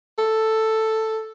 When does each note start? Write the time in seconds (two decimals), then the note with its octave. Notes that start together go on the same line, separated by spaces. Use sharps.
0.18 A4